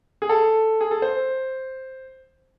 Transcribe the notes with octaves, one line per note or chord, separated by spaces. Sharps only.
G#4
A4
G#4
A4
C5